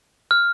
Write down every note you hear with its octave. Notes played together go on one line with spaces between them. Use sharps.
F6